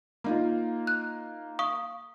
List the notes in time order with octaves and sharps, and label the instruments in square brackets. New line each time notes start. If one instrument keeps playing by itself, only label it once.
[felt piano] A#3 D#4 F4
[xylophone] F#6
F5 C#6 D#6